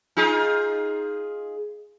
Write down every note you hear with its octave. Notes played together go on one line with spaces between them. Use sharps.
D#4 F4 G#4